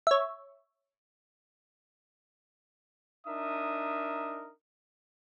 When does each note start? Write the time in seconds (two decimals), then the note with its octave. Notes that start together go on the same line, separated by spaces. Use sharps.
0.07 C#5 E5
3.27 D4 D#4 A#4 E5 D#6